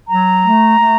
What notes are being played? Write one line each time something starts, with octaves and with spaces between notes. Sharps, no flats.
F#3 A#5
A3
A3